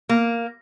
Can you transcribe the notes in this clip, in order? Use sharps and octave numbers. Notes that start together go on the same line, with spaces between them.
A#3